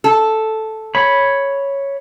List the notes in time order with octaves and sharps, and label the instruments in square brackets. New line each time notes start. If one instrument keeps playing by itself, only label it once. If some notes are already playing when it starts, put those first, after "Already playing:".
[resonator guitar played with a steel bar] A4
[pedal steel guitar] C#5 B5